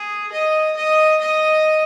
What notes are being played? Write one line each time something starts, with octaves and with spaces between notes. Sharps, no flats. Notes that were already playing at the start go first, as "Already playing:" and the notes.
Already playing: G#4
D#5
D#5
D#5